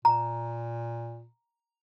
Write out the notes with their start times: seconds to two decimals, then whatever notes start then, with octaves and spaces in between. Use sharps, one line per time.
0.05 A#2 A#5